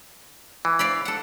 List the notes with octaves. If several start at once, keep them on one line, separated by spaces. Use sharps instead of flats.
E3
D5 F5 B5
A4 F#5